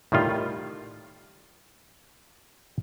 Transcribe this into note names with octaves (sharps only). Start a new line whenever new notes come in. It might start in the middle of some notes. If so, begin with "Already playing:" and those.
A2 D#3 G3 F4